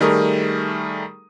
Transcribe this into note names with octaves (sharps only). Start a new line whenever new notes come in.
D#3 G3 A3 G#4 A#4 D#6